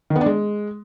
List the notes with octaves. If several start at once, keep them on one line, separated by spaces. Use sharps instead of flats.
D#3
B3
D4
G#3